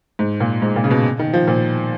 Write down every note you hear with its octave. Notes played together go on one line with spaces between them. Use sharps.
G#2
A#2
G#2
A#2
C#3
B2
D#3
F3
A#2